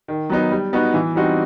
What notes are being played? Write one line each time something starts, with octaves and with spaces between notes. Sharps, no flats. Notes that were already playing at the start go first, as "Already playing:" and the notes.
D#3
F#3 B3 D#4
G3
B3 D#4 F#4
E3
G3 C4 D#4 F#4